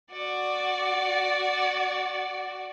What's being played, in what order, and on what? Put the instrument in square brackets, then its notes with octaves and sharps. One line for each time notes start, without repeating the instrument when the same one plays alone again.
[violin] F#4 D5